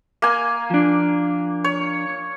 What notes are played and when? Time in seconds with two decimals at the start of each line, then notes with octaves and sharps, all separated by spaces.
0.22 A#3 G#5
0.70 F3 D4
1.64 C#5